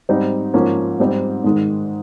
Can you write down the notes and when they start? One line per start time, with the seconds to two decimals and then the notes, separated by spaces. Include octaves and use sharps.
0.09 G#2 G3 C4 D#4
0.54 G#2 F3 A#3 C#4
1.00 G#2 G3 C4 D#4
1.44 G#2 D#3 G#3